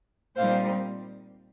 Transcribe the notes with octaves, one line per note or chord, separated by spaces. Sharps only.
A#2 G3 C4 D#4 C5 F5